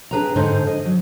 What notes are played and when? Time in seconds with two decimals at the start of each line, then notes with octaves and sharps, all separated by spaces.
0.11 D4 G#4 B4 G5 A#5
0.36 G#2 D3 D#4 C5
0.67 D#5
0.86 F#3